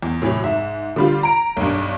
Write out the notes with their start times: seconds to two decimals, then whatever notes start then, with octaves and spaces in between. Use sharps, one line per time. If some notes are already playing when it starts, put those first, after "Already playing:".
0.03 E2
0.22 A2 C3 E3 F#3
0.44 G#2 E5
0.96 D3 G3 F4
1.23 A#5 D7
1.57 B1 G2